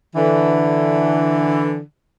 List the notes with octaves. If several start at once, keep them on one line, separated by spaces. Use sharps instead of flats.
D3 E3